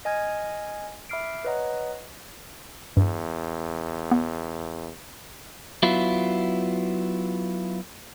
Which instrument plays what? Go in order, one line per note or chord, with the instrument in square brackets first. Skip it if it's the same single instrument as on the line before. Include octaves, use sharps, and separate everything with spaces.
[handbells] D#5 G#5 F6 G#6
E5 B5 D6 F6 C7 D7
B4 C#5 D#5 F#5 A#5
[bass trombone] E2 [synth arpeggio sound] G2
[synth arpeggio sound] B3
[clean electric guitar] F#3 B3 E4 F4